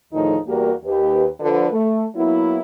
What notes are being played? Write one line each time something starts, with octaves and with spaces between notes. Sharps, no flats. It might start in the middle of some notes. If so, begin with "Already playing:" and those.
D2 A2 D#3 F3 D#4 G#4
E2 G3 A#3 F#4 G4 A#4
D#2 G4 B4
D3 F3 B4
A3
F#3 A#3 B3 E4